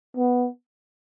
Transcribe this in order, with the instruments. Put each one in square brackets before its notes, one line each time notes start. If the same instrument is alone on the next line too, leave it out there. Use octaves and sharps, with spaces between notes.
[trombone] B3